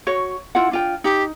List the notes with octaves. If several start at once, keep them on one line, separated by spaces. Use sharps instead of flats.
F#4 C#5
E4 F4 F#5
D4 F4 G5
D#4 G4